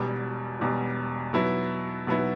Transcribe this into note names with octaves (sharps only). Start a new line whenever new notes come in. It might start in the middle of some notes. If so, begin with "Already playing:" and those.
Already playing: E1 E2 B2 G3
E1 E2 B2 G3
B2 F#3 B3 E4
B2 F#3 B3 E4